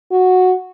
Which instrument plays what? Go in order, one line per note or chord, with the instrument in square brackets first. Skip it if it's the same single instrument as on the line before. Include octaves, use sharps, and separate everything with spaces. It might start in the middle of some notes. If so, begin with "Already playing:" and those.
[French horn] F#4